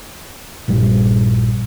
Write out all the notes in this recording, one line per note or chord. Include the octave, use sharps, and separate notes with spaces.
A#1 G2 G3